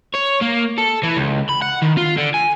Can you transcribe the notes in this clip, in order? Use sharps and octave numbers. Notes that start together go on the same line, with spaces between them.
C#5
A#3
A4
E3
C#2
B5
F#5
D#3
F4
D3
G#5